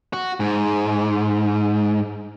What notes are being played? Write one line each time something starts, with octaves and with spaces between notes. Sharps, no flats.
F#4
G#2